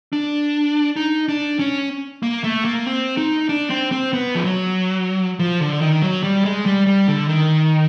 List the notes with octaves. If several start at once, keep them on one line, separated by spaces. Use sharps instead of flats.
D4
D#4
D4
C#4
A#3
A3
A#3
C4
D#4
D4
C4
C4
B3
F3
F#3
F3
D3
D#3
F#3
G3
G#3
G3
G3
D3
D#3